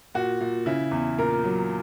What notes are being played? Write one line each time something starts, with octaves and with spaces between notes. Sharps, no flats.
A#2 F#4
A#2
C#3 E4
E2
A#2 A#4
F#3